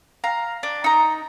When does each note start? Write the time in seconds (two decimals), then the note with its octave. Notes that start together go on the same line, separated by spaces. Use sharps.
0.24 F5 A#5
0.63 D4
0.84 D#4 A#5